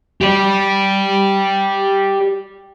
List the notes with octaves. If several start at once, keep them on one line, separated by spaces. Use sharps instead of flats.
G4 D5